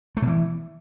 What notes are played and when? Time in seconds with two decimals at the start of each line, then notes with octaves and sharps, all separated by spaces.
0.17 A3
0.22 B2
0.27 E3